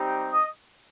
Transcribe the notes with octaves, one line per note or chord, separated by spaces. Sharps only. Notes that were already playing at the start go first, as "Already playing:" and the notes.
Already playing: G3 C4 D#4 G4
D#5 D#6